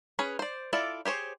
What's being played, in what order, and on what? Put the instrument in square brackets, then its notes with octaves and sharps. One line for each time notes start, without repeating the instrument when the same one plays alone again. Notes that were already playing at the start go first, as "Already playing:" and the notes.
[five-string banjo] C#4 G#4 B4
C5 D5
E4 F4 A4 D5
G4 G#4 C5 C#5